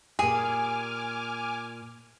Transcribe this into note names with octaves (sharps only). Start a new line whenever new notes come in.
A#2 G4 G#4 G#5 D6 F6